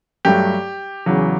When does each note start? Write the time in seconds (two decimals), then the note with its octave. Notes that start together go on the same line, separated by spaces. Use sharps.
0.25 G2 F#3 A3 G4
1.06 E2 C#3 F#3